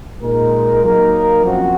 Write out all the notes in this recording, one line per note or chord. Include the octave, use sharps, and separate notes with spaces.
A#2 G#3 D#4 A#4
F#3 A#3 D#4 A#4
F#2 F3 C4 F#4